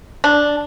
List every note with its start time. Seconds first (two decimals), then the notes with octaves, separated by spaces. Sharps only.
0.24 D4